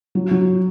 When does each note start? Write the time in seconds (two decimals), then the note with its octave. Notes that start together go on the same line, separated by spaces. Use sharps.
0.15 F#3
0.31 F#3